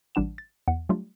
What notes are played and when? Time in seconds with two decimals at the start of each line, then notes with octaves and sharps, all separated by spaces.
0.15 A1 G3 D4 F#5 E7
0.38 A6
0.68 E2 F#5
0.89 F#3 G3 A3 D4 F4 G4